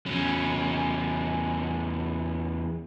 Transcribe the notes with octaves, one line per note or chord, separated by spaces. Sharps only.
E2 C#4